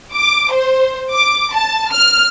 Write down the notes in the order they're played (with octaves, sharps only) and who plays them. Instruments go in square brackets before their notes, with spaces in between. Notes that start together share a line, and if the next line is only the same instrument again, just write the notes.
[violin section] D6
C5
D6
A5
F6